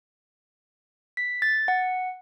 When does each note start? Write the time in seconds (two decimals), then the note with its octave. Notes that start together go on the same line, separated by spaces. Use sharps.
1.17 B6
1.42 A6
1.68 F#5